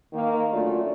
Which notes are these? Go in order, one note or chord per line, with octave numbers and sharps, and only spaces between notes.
D#3 A#3
F#2 D3 A3 F4 F#4 D5